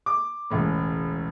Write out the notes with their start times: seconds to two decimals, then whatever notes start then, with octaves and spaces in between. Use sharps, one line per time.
0.06 D6
0.50 E1 C#2 A2